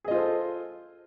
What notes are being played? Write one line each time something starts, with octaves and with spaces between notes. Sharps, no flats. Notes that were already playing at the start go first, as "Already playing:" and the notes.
F4 G#4 A4 C5 D#5